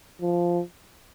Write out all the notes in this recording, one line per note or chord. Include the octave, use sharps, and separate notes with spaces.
F3